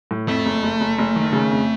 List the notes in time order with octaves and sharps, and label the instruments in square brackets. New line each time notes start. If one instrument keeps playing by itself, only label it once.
[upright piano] A2
[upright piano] F2 [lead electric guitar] A3
[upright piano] F#1
F#1
F#1
F#1
D#3
C#3
F2